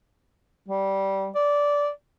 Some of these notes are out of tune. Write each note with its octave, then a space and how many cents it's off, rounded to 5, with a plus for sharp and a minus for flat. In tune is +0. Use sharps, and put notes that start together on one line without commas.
G3 -15
D5 -15